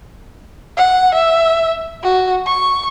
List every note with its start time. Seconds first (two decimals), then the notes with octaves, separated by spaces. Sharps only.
0.77 F#5
1.15 E5
2.03 F#4
2.46 C#6